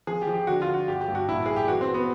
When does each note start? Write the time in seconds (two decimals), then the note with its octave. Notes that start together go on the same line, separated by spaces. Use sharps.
0.07 F3 G#4
0.22 G4
0.27 F3
0.34 G4
0.47 D3 F#4
0.62 F4
0.67 D3
0.74 F#4
0.87 G1 G4
1.01 G4
1.08 G2
1.15 F#4
1.28 A#1 E4
1.46 A#1 G#4
1.56 G4
1.68 E3 F#4
1.81 C4
1.89 E3
1.94 B3